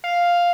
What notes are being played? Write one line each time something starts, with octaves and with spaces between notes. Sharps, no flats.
F5